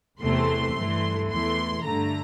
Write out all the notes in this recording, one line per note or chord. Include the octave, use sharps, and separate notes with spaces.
E2 C3 E3 A3 C6
G2 E3 A3
E2 E3 A3 C6
G2 D3 A3 A#5